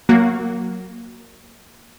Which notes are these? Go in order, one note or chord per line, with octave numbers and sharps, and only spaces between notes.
F#3 A#3 F#4